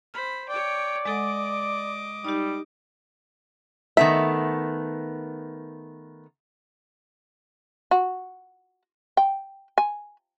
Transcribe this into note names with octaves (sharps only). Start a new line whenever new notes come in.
C5 B5 F6
C#5 D5 G5
G#3 A4 D#5 F#5 D6
G3 D#4 G4
D#3 A3 B3 E5
F#4
G5
G#5